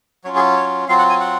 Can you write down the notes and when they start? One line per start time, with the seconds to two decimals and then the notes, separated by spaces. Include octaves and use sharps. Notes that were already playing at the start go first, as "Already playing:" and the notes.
0.24 F#3 C#4 F4 C#5
0.35 G#4
0.56 C#5
0.89 F#3 C4 F4 F5
0.98 F#5
1.10 G#5
1.20 F#5